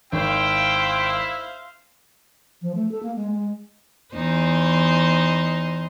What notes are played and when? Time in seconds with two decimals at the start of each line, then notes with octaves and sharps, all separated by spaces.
0.12 G#1 E4 C5 E5 F5 G5
2.62 F3
2.75 A3
2.92 A4
3.03 A#3
3.16 G#3
3.31 G#3
4.14 E2 D#4 C5